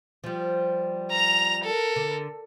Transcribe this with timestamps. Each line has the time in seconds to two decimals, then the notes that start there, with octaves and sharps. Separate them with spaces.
0.24 F3 G3
1.11 A#5 F7
1.64 A4 A#4
1.96 D3